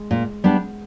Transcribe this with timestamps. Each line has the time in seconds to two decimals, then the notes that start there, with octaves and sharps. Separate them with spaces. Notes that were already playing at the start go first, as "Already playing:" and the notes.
Already playing: G#3
0.11 A#2
0.44 G3 B3 D4